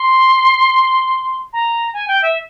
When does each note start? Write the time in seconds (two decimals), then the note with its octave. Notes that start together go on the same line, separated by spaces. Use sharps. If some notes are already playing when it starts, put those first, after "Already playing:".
Already playing: C6
1.53 A#5
1.94 G#5
2.08 G5
2.22 E5